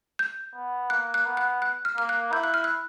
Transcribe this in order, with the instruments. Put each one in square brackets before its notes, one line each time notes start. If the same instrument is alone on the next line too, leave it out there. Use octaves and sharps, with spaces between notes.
[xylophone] G6
[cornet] B3
[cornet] A#3 [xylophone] F#6
[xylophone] F#6
[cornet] B3
[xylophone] F#6
F#6
F6
[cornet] A#3 [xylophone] F6
[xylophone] F#6
[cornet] E4 [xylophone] G6
[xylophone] F#6
F6
F#6